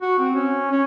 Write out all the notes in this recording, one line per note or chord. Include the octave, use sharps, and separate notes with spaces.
F#4
C4
C#4
C#4